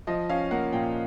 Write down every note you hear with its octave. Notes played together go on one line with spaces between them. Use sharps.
F3 D#5
C#4 F5
A#3 F#5
A#2 G5